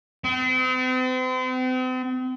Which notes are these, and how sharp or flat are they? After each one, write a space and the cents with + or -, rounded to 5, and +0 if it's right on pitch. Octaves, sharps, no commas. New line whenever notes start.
C4 -40